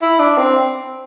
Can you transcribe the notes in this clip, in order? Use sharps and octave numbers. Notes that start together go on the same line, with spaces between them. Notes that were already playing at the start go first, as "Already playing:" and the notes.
E4
D4
C4